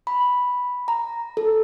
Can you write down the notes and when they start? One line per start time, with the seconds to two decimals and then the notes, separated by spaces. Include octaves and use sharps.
0.07 B5
0.88 A#5
1.37 A4